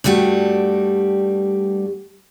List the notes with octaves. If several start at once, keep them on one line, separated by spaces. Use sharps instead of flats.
G2 G3 A3 F#4 G4